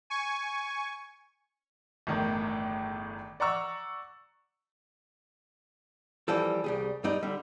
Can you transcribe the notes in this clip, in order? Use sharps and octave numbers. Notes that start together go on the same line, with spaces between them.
G#5 C#6
G1 E2 A2 D#3
D5 F#5 A#5 C#6 E6
E3 F3 G3 A4
C2 G3 G#4
G2 G3 D#4 D5
D3 G3